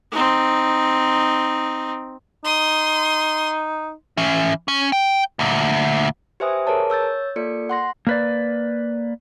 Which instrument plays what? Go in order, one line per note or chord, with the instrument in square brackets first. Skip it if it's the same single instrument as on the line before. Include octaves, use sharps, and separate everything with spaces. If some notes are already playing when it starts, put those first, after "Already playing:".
[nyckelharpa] C4 D#4
[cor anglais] D#4 [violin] C6 D#6
[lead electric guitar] E3 C#4
C#4
G5
D2 A#2
[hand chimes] G4 B4 C5 E5 G#5 D#6
G#4 A#4 B4 C#5 A5
C#5 E6 G6 A6
A#3 F4 A4 D5 C#7
F#5 C6 A#6
[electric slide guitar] A#3 B4 D5